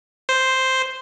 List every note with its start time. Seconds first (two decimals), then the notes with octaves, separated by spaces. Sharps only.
0.29 C5